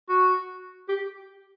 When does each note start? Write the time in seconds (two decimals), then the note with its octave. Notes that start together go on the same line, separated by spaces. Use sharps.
0.09 F#4
0.88 G4